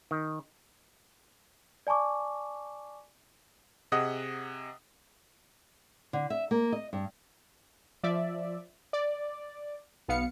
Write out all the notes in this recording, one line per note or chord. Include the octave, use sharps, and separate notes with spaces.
D#3
D5 G#5 A5 C#6 D6
C3 G#4 D#5 F#5 D#6
D3
E5
A#3
D#5
G2
F3 D5 E5
D5
B1 B3 F5 C#7